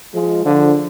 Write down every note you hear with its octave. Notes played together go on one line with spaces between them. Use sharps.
F3 G#3
D3 F3